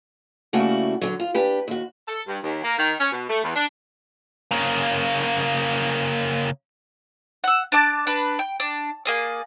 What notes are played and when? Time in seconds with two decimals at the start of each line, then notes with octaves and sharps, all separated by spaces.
0.53 C#3 G3 A3 A#3 E4 F#4
1.01 D3 F#3
1.20 F4
1.34 D4 G4 B4
1.68 D#2 F#4
2.07 A4
2.27 G2
2.43 D#2
2.63 A#3
2.78 D#3
2.99 C#4
3.12 B2
3.28 A3
3.43 E2
3.56 D4
4.51 C#3 A#3
7.44 F#5 E6
7.72 D4 D5 A5 D6
8.07 D4 B4
8.39 G5
8.60 D4
9.05 A#3 G#4 D5